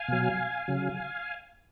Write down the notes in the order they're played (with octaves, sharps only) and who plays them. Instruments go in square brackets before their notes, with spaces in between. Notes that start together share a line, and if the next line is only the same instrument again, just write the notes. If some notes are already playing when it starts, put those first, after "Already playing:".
Already playing: [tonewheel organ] F5 G#5
B2 F#3
C#3 F#3